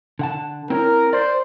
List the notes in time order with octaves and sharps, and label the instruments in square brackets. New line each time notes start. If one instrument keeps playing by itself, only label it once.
[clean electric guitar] D3 F#5 A5
[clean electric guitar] C4 E4 C#5 [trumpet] A#4
[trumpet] C5 [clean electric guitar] D5